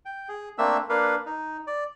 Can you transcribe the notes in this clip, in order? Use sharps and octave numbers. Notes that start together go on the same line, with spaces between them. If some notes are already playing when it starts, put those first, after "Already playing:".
G5
G#4
A3 A#3 C4 D4 E5 E6
A#3 D4 A#4 B4 F5
D#4
D5